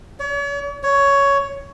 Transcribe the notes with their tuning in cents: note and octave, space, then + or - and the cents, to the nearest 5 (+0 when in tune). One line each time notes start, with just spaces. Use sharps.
C#5 +40
C#5 +10